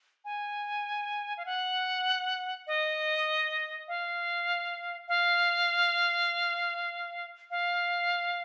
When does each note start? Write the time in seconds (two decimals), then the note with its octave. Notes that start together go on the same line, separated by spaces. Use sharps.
0.25 G#5
1.37 F5
1.46 F#5
2.67 D#5
3.88 F5
5.08 F5
7.51 F5